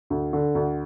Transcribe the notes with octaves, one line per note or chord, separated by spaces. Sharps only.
D2
D3
D2